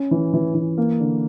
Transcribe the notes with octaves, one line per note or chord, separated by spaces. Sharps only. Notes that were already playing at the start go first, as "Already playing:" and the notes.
Already playing: C#4
E3
E3
E3
A#3
D3